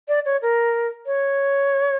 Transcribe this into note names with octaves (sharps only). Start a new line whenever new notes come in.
D5
C#5
A#4
C#5